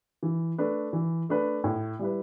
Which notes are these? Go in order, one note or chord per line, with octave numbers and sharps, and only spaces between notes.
E3
A3 D4 B4
E3
A3 D4 B4
A2
G3 E4 B4